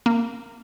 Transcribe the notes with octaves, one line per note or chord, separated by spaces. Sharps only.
A#3